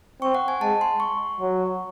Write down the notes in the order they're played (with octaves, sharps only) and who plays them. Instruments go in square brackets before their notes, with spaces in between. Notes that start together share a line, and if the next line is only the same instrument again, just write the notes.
[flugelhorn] C4 [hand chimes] C#6
[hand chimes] F#5
G#5
[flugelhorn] G#3 [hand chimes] A5
[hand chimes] C6
C#6
[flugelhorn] F#3